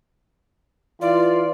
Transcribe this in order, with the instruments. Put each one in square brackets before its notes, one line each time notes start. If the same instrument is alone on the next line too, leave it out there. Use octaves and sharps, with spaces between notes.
[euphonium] E3 [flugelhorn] F4 [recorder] D5